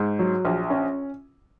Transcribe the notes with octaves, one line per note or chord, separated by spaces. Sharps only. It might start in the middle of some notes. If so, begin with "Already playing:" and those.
Already playing: G#2
F#3
A#1
C#4